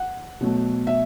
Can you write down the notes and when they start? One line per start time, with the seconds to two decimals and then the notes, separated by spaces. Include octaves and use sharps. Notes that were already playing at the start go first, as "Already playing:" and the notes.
Already playing: F#5
0.41 B2 F#3 A3
0.87 E5